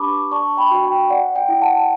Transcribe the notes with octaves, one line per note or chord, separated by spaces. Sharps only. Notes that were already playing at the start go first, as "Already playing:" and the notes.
Already playing: D4 G4 B4 A5 B5 C#6 D6
D5 A5 C#6
G5 B5
F#4
G5
D5 F#5
G5
E4
F#5 A5